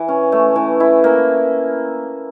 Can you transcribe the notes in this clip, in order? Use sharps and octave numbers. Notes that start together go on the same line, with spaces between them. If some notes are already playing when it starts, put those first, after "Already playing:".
Already playing: E3
C#4
A3
E3
E4
A#3